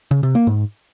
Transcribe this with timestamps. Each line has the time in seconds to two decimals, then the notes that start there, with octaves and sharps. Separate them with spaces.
0.11 C#3
0.23 C3
0.35 A#3
0.47 G#2